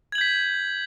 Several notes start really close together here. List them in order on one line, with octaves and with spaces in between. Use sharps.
G#6 F#7 G6 B6